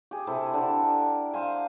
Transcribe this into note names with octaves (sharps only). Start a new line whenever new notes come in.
G4 G#4
C3 E4 A4
D3 D4
A#4
C5 F5 G#5